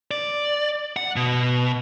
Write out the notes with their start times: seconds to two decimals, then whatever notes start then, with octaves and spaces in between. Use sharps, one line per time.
0.11 D5
0.97 F#5
1.16 B2